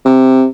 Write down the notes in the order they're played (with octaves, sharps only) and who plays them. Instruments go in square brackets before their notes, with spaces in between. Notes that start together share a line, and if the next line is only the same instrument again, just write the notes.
[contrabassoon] C3